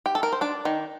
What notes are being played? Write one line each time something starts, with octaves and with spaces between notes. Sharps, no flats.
G4
A4
A#4
C5
D4 D5
D#3